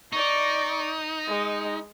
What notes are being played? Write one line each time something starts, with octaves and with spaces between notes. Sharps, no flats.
D#4 D5 C#6
G#3